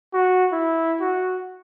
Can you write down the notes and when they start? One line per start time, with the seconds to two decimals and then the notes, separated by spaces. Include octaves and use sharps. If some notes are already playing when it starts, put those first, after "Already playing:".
0.13 F#4
0.52 E4
1.01 F#4